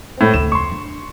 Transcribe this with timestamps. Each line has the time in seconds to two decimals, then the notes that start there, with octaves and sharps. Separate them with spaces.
0.17 A2 C4
0.34 D2 D3 E7
0.52 F2 C6 C#6
0.72 D4